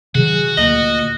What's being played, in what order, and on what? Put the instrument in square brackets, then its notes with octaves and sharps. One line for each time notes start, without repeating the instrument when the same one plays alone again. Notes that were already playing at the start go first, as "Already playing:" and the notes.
[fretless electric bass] C3 D#3 F#3 [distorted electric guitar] F#4 [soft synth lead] G#4
[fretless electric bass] D2 [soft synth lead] A#2 [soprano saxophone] D#5